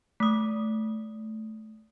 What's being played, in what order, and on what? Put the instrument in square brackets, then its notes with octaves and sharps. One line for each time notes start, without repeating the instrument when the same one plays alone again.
[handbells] A3 D#6